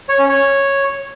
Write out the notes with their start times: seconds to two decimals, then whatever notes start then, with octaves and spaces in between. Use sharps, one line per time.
0.09 C#5
0.19 C#4
0.29 C#5